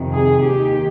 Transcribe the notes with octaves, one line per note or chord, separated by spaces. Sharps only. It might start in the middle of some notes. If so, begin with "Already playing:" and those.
Already playing: F2 C3 D#3
G#4
D#2 D#3 G4